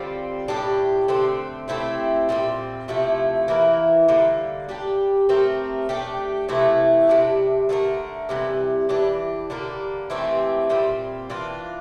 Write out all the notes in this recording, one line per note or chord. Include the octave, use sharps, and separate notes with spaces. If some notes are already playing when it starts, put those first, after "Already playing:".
Already playing: D3 G3 C4 F4
A2 G3 D4 G4
D3 A3 C4
A3 C4 E4 G4
A#2 G3 C4
C3 F3 A3 E4
E3 A#3 E4 A#4
D3 G3 A#3
G3 D4 G4
A3 C4 G4 A#4
A3 D4 G4
C3 E3 A3 E4
C3 G3 D4
D3 A3 E4 A#4
C3 E3 G3
E3 G3 D4
D3 G3 A#3
E3 A3 C4 G4
A#2 G3 C4
E3 A#3 D4 F4